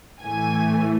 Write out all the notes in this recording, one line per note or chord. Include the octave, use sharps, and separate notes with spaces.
A2 E3 A3 G#5